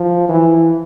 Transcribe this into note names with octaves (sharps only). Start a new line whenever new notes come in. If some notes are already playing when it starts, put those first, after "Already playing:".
Already playing: F3
E3